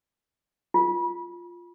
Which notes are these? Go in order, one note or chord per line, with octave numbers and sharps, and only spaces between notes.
F4